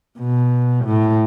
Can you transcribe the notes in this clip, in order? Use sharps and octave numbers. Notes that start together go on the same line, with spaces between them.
B2
A2